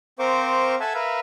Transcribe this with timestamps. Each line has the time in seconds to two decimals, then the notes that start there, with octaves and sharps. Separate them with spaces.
0.19 C4 A#4 C5 F5 C#6 D6
0.80 A4 E5 F#5 G#5 A5
0.94 A#4 B4 E5 F5